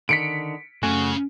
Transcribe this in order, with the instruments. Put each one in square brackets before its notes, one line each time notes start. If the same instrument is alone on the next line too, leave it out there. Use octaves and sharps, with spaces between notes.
[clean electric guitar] D3 D#3 [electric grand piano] B6 C#7 D7
[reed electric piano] F#2 A3 G#5 [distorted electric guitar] C#3 [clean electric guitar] F#4